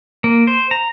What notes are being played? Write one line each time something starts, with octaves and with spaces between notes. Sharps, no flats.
A#3
C5
A#5